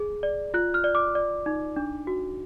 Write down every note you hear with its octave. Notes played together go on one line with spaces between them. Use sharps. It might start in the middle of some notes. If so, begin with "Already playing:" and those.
Already playing: G#4
D5
F4 F#6
F6
D5
D6
D5
D#4
D4
F#4